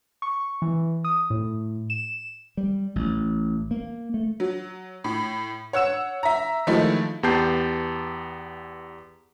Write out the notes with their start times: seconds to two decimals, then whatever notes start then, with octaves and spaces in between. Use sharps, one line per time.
0.22 C#6
0.62 E3
1.04 D#6
1.30 A2
1.90 E7
2.57 G3
2.96 A1
3.71 A#3
4.14 A3
4.40 F#3
5.04 A2
5.73 C#5 F#5 E6 E7
6.23 E5 A#5
6.67 D#3 F3 F#3 G#3 A3 E4
7.23 E2 B3 G4 A5 G6 C7